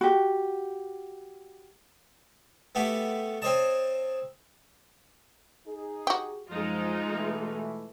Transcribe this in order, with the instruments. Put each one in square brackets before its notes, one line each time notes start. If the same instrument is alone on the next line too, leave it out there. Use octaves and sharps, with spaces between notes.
[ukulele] F#4 G4
[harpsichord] A3 B3 F#4 G4
C4 C5 C#5 D#5 A5
[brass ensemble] D#4 G#4
[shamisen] F#4 G4
[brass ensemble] F#2 F3 [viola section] G#3 D#4 F4
[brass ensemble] B2 E3 A3